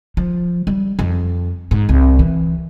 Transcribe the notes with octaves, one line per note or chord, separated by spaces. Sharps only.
F3
G3
F2
G#2
C2
E3